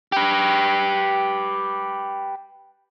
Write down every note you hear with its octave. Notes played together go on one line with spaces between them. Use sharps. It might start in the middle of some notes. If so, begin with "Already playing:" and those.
G4 B4